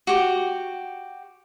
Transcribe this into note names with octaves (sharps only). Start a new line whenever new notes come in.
F#4 G4